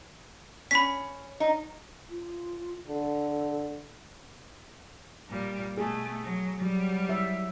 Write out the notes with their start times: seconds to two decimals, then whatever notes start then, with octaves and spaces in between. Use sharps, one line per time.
0.71 C#4 B5 B6
1.40 D#4
2.10 F4
2.87 D3 A4
5.29 A#2 G3
5.77 B2 A3 G#4
6.23 F#3
6.61 F#3 G3
7.09 E5